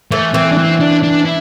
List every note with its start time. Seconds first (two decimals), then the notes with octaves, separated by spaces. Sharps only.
0.11 E3 A3
0.34 E3 C4
0.52 D4
0.58 C4
0.80 D4
1.03 D4
1.25 E4